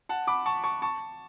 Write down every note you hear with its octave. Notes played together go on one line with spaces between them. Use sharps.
F#5 A5
B5 D6
A5 C#6
A5 C#6
A5 C#6